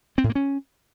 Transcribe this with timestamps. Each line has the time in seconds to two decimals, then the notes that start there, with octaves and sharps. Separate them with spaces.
0.18 C4
0.24 A2
0.30 A#3
0.35 C#4